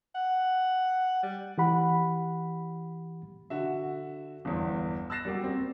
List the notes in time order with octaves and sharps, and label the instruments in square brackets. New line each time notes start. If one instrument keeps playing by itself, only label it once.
[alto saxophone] F#5
G3
[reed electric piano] E3 G4 F#5 B5
[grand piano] D3 F#4 E5
G1 E2
E6 F#6 A6 A#6 C7 E7
G3 A#3 F#4 G4
C4